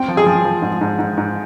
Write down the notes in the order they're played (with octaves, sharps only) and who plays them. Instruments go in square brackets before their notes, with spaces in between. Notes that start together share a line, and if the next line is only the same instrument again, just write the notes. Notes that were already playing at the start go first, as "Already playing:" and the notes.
Already playing: [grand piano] C4 [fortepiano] G5
[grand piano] F3
[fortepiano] G#4
[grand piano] F3
F3
G#2
G#2
G#2
G#2